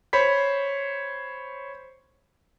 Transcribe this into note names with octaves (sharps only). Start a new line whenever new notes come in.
C5 C#5 B5 B6